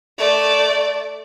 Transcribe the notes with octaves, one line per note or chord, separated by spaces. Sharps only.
A3 D5